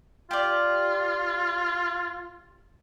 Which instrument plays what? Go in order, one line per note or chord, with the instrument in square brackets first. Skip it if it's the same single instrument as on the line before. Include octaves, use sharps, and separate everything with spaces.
[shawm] F4 [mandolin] G4 D5